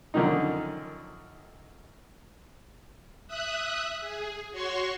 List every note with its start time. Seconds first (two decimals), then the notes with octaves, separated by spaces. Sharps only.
0.14 F#2 D3 D#3 F3 D#4
3.28 E5 D#6 F#6
4.01 G#4
4.52 F#4 C#5 C6 C#6